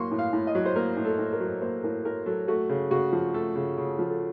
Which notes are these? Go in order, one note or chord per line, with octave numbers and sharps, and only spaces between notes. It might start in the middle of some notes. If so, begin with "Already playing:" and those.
Already playing: A2 F#3 A#3 C6 C#6
A2
F5
A2
D#5
F#3
C5
A#3 A#4
A2
A4
A2
A#4
F#3
A#3 C5
A2 A#4
A2 A#4
F#3 A4
A3 F#4
C#3
C#3 F#4
F3
A3 A4
C#3
C#3
F3
A4